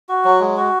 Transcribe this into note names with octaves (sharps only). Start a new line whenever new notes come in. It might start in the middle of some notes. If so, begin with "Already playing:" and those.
F#4
F#3
G#3
F#4